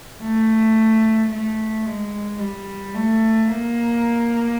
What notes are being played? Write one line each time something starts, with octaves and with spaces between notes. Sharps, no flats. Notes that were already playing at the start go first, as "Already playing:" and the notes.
A3
A3
G#3
G3
A3
A#3